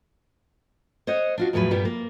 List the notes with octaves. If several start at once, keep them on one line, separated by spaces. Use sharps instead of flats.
C5 C#5 D#5 F#5
D4 F4 F#4
E2 A2 F3 F#3 B4
G2 A#2 G3 B3
A#3